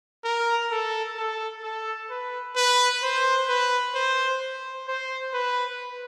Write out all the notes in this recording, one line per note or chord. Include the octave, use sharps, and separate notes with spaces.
A#4
A4
A4
A4
B4
B4
C5
B4
C5
C5
C5
B4